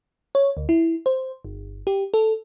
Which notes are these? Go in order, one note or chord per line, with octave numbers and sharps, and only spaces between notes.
C#5
D2
E4
C5
G1
G4
A4